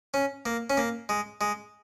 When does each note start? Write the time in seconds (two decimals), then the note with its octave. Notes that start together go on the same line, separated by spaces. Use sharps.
0.14 C#4
0.46 A#3
0.70 C#4
0.77 A#3
1.09 G#3
1.41 G#3